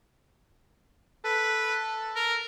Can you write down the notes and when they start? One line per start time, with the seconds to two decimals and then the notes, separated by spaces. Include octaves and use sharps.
1.25 A4 B4
2.16 A#4